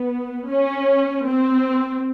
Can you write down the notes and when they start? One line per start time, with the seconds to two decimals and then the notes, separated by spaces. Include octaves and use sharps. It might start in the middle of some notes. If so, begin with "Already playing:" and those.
Already playing: B3
0.48 C#4
1.27 C4